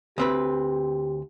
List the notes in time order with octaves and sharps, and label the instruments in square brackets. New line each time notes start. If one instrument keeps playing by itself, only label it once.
[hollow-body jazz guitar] D2 C4 B4 [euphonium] G4